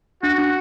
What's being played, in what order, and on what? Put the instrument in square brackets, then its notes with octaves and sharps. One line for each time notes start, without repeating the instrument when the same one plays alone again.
[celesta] D4 [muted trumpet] F#4
[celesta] D4